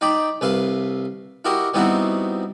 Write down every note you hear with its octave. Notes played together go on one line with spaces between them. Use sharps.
D#4 D5 G5 B5
C2 B4 E5 F5
E4 F#4 G4 A#4 D#5
G3 B3 C4 D#4 E4 F#4